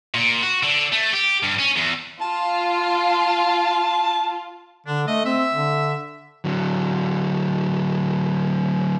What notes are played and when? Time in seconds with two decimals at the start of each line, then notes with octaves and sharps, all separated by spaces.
0.14 A#2
0.43 F#4
0.63 D3
0.92 A3
1.13 G4
1.43 G2
1.59 C#4
1.76 E2
2.21 F4 A5
4.86 D3 D4
5.07 A3 D#5
5.25 C4 E5
5.53 D3
6.44 D3 F#3